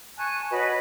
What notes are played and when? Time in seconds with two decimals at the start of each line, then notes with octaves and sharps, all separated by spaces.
0.18 G#5 A5 C#6 F#6
0.51 F#4 B4 C#5 D#5